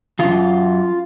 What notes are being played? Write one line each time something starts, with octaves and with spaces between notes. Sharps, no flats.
F#2 D#3 F4